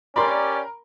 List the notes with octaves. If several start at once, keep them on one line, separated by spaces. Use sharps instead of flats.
C#4 G4 A#4 D5 B5 C6